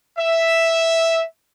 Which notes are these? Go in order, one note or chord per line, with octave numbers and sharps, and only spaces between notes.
E5